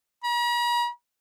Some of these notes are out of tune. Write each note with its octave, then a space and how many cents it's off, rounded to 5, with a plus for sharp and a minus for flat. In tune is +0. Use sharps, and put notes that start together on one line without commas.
A#5 +45